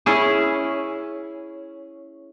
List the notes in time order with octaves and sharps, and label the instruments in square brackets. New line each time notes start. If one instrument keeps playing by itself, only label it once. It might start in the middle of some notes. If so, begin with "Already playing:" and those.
[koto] C#4 E4 G#4